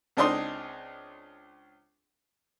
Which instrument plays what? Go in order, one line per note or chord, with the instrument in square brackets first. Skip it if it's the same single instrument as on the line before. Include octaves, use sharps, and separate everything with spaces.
[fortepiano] C#2 C4 D4 D#4 D#5 C6